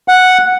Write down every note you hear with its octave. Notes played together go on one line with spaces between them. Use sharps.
F#5